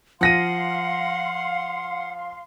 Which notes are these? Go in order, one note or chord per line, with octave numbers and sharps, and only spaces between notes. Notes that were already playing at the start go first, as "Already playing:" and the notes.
F3 F5 F#5 C6 A#6 D#7